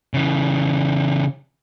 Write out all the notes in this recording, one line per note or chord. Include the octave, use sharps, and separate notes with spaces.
C#3 E3